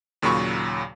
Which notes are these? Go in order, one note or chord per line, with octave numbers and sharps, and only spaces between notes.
D#2 A#2 C#3 F#3 B5 C#6